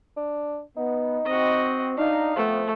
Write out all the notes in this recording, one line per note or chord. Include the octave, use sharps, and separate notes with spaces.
D4
B3 D#4
C4 F#4 D#5
D4 D#4 F5
F3 A3 B3 C4